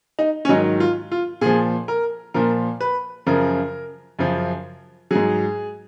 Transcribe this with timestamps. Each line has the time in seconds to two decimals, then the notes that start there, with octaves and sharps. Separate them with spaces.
0.19 D#4
0.45 C#4
0.49 G#2 D#3 F#3 D#4
0.80 F4
1.11 F4
1.41 A#2 F3 G#4
1.88 A#4
2.34 A#2 F3 A#4
2.81 B4
3.26 F#2 C#3 F3 A#4
4.19 F#2 C#3 F3
5.11 G#2 F#3 G#4